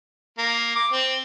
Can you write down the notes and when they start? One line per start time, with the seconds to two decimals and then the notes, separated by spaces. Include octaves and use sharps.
0.38 A#3
0.76 D6
0.92 C4